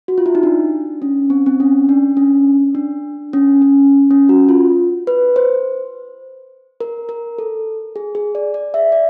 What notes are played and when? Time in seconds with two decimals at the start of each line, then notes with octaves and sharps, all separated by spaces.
0.08 F#4
0.18 F4
0.26 E4
0.35 D#4
0.43 D4
1.02 C#4
1.30 C4
1.46 C4
1.60 C#4
1.89 D4
2.17 C#4
2.75 D4
3.33 C#4
3.62 C#4
4.11 C#4
4.29 F#4
4.49 F4
5.07 B4
5.36 C5
6.80 A#4
7.09 A#4
7.38 A4
7.96 G#4
8.15 G#4
8.35 D5
8.54 D5
8.74 E5
8.92 D5